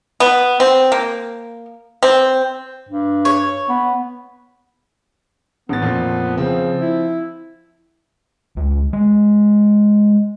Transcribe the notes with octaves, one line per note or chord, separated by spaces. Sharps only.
B3
C4
A#3
C4
G2
C#5
B3
A1 B3 A6
F2 A#2 F3
C#3 F3 C4
E4
C#2
G#3